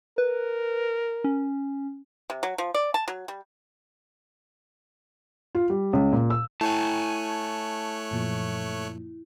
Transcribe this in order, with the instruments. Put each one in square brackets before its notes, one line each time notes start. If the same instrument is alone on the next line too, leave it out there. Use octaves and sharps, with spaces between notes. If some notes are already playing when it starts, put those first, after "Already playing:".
[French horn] A#4 [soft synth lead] B4
[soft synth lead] C#4
[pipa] C3
F#3
F3
D5
A5
F#3
G3
[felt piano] F4
G3
C#2
A#2
E6
[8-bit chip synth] A3 C#5 F#6 [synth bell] E4 [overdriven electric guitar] G#5 A5
[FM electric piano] F#2 A#2 F3